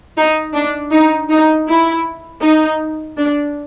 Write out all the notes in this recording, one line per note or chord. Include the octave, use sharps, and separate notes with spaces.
D#4
D4
D#4
D#4
E4
D#4
D4